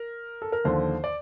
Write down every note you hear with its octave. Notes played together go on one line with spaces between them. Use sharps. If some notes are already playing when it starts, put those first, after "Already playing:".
Already playing: A#4
A4
A#4
D#2 D3 F3 C5
D5